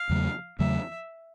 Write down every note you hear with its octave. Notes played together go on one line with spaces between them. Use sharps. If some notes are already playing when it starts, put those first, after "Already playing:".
Already playing: F5
E2 C#3 F#3 A3
E2 C#3 F#3 A3 E5